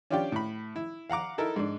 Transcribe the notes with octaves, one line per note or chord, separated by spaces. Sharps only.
C#4 D4 F4 G4 D5 G5
A2 B5
E4
F5 F#5 A#5 D6
D#4 E4 A4 A#4
G#2 D4